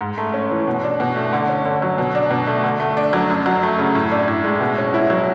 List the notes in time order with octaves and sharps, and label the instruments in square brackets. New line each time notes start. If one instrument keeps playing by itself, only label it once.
[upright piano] G#2
A3
C#4
E3
B2
D4
B2
A3
D3
C#4
D3
F#3
B2
D4
B2
A3
D3
A3
D4
F#3
F#2
F#3
A3
C#3
A2
D4
A2
G#3
B2
C#4
E4
F#3